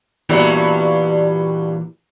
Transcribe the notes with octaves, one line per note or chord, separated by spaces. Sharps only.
G2 A#2 E3 F#3 G3 B3